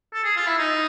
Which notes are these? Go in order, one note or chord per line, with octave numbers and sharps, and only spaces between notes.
A4
G#4
F4
E4
D#4